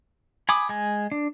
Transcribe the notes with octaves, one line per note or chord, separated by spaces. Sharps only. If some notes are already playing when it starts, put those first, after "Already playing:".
G#5 B5 D6 D#6
G#3 G#5
D4